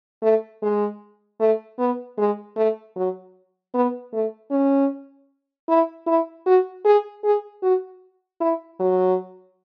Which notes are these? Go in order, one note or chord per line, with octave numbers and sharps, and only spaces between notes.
A3
G#3
A3
B3
G#3
A3
F#3
B3
A3
C#4
E4
E4
F#4
G#4
G#4
F#4
E4
F#3